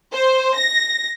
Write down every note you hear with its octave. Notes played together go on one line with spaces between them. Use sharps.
C5
A#6